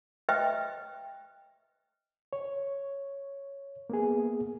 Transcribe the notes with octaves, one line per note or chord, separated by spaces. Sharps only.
B4 C5 D#5 E5 G5
C#5
A#3 B3 G#4